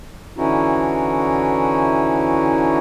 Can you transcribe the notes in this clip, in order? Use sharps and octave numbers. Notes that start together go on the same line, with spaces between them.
D3 E3 C#4 D#4 E4 F#4